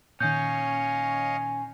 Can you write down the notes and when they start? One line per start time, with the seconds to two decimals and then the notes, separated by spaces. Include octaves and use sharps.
0.20 A#2 D#3 C#4 C#5 D#5 F5 G6